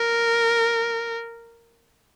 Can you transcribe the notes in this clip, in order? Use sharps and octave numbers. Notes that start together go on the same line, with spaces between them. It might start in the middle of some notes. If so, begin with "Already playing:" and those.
Already playing: A#4